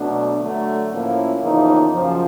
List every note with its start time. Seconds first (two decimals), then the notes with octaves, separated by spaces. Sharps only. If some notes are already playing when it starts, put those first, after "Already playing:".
Already playing: B2 F#3 A3 D4
0.40 D3 F#3 A3
0.91 A2 F3 A#3 C#4 E4
1.41 E2 C#3 F3 A#3 D#4
1.92 F#2 C#3 F3